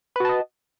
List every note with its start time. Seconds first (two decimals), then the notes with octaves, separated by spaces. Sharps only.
0.16 B4
0.20 F#4
0.25 A5
0.29 D#5